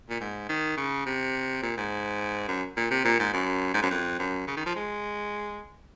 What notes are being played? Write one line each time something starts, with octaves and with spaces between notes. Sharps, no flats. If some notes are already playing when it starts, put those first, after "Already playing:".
A#2
G#2
D#3
C#3
C3
A#2
G#2
F#2
A#2
C3
A#2
G#2
F#2
G#2
F#2
F2
F#2
C#3
D#3
F3
G#3